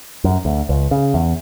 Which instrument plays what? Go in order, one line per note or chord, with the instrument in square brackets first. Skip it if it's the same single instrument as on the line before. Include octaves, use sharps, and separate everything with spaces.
[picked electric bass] F#2
D2
C#2
C#3
E2